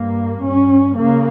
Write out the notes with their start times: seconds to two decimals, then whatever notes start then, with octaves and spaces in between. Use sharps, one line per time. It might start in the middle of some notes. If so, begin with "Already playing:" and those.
Already playing: G2 A#3
0.43 G2 C#4
0.99 C#3 A#3